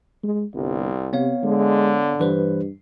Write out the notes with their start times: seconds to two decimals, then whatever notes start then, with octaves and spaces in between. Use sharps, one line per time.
0.24 G#3
0.54 G1 C2
1.13 C3 B3 C#5 F5
1.44 D3 G#3
2.19 G2 E3 B4 C5